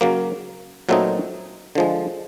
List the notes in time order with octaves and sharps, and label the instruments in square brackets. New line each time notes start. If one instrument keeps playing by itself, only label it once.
[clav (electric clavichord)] C#3 F#3 A#3
A#2 F#3 A3 C4 D#4
D3 F3 G#3